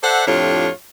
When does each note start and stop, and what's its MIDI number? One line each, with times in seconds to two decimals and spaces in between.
0.04 0.25 69
0.04 0.25 72
0.04 0.25 74
0.04 0.25 76
0.04 0.25 78
0.27 0.69 41
0.27 0.69 45
0.27 0.69 62
0.27 0.69 65
0.27 0.69 67
0.27 0.69 73